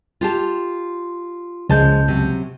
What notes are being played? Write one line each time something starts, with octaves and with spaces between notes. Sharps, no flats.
F4 G4 A5
C#2 F3 G#3 A5 G6
C3 F#3